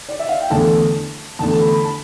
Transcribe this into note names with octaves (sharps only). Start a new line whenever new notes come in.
D5
E5
F5
G5
E2 D3 A3 A5
E2 D3 A3 A5
A5
B5
B5
A5